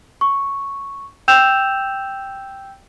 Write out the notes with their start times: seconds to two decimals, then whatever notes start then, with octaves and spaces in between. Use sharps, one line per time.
0.21 C#6
1.28 G5 E6 G6 E7 F7